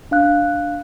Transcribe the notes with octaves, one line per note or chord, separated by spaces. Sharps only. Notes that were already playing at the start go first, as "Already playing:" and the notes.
D4 F5 F#6